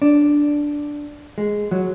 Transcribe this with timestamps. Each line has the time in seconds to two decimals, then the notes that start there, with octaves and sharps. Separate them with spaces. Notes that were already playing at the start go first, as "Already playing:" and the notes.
0.02 D4
1.38 G#3
1.71 F#3